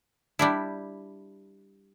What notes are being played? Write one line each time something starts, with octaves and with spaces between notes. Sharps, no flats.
G3 D4 E4